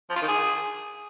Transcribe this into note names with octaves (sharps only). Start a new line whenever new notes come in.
F3
F4
D#3
G#4